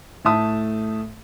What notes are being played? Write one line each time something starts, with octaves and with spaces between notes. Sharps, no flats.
A2 A3 E5 A5 D#6